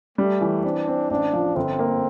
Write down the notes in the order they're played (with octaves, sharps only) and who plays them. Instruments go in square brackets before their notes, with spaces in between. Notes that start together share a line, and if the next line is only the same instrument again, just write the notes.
[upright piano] G3 [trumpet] A3
[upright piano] E3
[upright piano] C4 [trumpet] D4
[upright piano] C4
[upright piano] A1 [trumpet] D4
[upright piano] F3
[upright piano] G1 [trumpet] C4
[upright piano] A#3